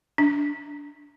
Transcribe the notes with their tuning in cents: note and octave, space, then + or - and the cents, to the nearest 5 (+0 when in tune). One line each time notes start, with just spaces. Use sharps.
D4 -20